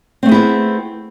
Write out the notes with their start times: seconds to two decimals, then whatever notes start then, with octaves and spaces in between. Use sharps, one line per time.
0.23 C4
0.26 A3
0.29 G#4
0.32 E4
0.35 B3